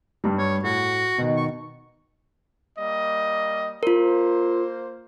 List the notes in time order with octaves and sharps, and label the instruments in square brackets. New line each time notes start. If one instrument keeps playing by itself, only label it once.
[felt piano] G2 G3
[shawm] C#5
[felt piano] A2 [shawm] F#4
[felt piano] B2 D#3
[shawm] C#6
[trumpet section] G3 A#3 D#5
[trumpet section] A#3 C5 [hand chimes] F4 A#4